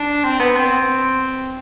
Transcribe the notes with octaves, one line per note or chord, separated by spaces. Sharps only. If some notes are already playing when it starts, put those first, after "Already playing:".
Already playing: D4
C4
B3
C4